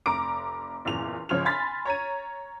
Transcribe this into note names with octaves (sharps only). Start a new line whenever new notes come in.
F1 A#5 D6 D7
F#1 E2 A#2 F7
G#1 C#3 F3 C#5 F6 F7
G#5 B5 C6 A6 B6
C#5 A#5 G#6 D#7